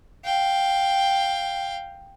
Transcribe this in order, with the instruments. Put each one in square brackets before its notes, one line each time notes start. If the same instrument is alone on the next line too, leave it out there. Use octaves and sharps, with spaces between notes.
[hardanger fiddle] F5 G5